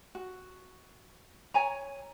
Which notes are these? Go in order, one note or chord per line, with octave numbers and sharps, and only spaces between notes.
F#4
C#5 G#5 A#5